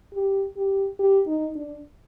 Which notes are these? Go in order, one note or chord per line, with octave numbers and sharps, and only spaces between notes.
G4
G4
G4
D#4
D4